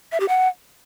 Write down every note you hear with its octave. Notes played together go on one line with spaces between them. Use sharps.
E5
G4
F#5